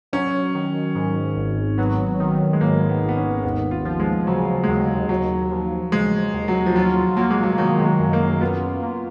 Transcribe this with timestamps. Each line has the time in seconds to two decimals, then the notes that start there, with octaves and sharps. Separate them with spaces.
0.13 F#3 C#4
0.55 D#3
0.95 G#2
1.36 G#1
1.78 F#3 B3
2.20 D#3
2.53 G#3
2.61 G#2 A#3
2.89 B3
3.02 G#1
3.09 B3
3.17 C#4
3.43 D#2 B3
3.71 F4
3.85 F3
4.00 G#3
4.27 C#3 F#3
4.63 G#3
4.68 D#2 F#3
5.09 D#2 F#3
5.51 F3
5.92 C#3 G#3
6.33 D#2
6.48 F#3
6.66 F3
6.76 F#3 F4
7.17 F#3 A#3
7.30 G#3
7.44 F#3
7.58 D#3 F#3
7.80 G#3
7.85 F#3
7.99 F#2
8.13 A#3
8.41 B3 F4
8.83 A#3